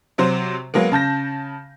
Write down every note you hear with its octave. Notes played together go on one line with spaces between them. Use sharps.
C3 F#3 C5
F#3 G#3 A#3 B3
C#3 A5 G6 A#6